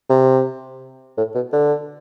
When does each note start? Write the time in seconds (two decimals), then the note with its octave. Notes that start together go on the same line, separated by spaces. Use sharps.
0.09 C3
1.17 A2
1.35 B2
1.53 D3